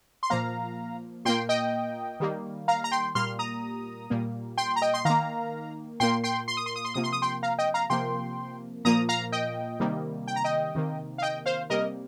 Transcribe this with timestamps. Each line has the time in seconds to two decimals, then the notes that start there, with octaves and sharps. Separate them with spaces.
0.23 C6
0.30 A#2 F3 A#3 F5 A#5
1.25 A#2 A#3 G5 C6
1.49 D#5 G5
2.20 D#3 G3 A#3
2.68 F5 A#5
2.84 A#5
2.92 G5 C6
3.15 A#2 G3 A#3 C6 F6
3.39 A#5 D#6
4.10 A#2 G3 A#3
4.58 G5 C6
4.76 A#5
4.82 D#5 G5
4.94 C6
5.05 D#3 A#3 F5 A#5
6.00 A#2 A#3 G5 C6
6.24 G5 C6
6.48 C6
6.57 D#6
6.66 C6
6.76 D#6
6.85 C6
6.94 C3 F3 A#3 D#6
7.04 C6
7.13 D#6
7.22 G5 C6
7.43 F5 A#5
7.58 D#5 G5
7.74 F5 A#5
7.90 C3 F3 A#3 G5 C6
8.85 A#2 F3 A#3 A#5 D#6
9.09 F5 A#5
9.32 D#5 G5
9.80 C3 D#3 G3 A#3
10.27 G5
10.36 A#5
10.44 D#5 G5
10.75 C3 D#3 A#3
11.18 F5
11.22 D#5 G5
11.46 C5 F5
11.70 C3 G3 A#3 A#4 D#5